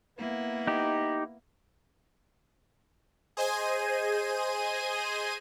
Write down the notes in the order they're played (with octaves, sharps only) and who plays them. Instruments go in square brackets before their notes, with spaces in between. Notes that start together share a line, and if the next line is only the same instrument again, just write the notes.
[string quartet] A#3 B3 E4
[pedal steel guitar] D#4 G4
[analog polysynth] G#4 C5 D#5 G#5 D#7